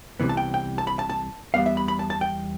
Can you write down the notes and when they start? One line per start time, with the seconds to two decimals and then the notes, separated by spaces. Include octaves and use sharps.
0.20 C2 C3 E3 B3
0.29 A5
0.37 G5
0.54 G5
0.78 A5
0.87 B5
0.99 A5
1.10 A5
1.54 E2 B2 G3 B3 F5
1.66 E5
1.77 B5
1.88 B5
1.99 A5
2.10 A5
2.21 G5